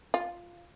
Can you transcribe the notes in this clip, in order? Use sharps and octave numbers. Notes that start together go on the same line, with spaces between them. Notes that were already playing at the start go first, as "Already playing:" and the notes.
F4